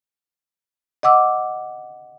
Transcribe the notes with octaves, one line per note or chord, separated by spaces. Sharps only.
D#5 F#5 D6 E6